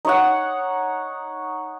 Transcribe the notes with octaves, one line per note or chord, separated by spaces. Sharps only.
D#4 C#5 F#5